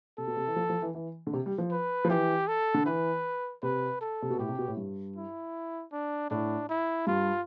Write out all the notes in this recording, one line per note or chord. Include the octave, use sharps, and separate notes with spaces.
C3 A4
B2
C3
E3
F3
F3
E3
E3
D3
C3
G3
F3
B4
F3
E3 G4
A4
D3
E3 B4
C3 B4
A4
C3
B2
A2 G4
C3
B2
A2
G2
E4
D4
A2 D4
E4
G2 F4